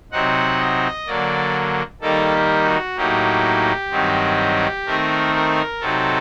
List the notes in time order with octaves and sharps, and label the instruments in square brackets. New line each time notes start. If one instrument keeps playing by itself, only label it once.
[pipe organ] C3 F#3 C4 D#4 F#5
D#5
D3 F#3 A#3 D5
D#3 G3 A#3 D#4 A4
G4
F#4
A2 F#3 A#3 D#4 G4
G2 D#3 F#3 C4 D#4
D#3 A3 C4 D#4 A#4
A#4
C3 F#3 C4 D#4 A4